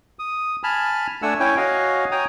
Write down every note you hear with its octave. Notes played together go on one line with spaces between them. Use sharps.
D#6
G#5 A5 B5 F6
A3 D4 F#5 G#5 E6
C#4 E4 C#5 G5 G#5
F#4 C#5 D#5 F5 G#5
C#5 G5 G#5 A#5 D#6